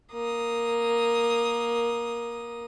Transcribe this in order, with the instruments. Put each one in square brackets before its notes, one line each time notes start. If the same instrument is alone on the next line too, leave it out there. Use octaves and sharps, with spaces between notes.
[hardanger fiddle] A#3 D#6